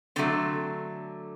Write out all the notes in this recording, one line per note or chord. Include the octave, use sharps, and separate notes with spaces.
D3 F#3 A3 C4